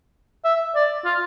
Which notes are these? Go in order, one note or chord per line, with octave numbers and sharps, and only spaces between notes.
E5
D5
F4